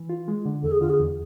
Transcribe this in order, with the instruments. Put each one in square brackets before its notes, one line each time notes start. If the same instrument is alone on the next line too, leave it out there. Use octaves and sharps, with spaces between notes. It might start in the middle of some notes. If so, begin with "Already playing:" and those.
Already playing: [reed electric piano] E3
F4
G#3
D3
[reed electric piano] E2 [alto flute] A4
[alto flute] G#4
[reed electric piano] D3 [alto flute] F4
[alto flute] G#4
[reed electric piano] E2